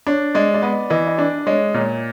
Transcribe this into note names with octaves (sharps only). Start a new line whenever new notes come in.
D4 C#5
G#3 D5
D5
B3 D#5
E3 D#5
D#5
D4 D5
G#3 C#5
A#2 C#5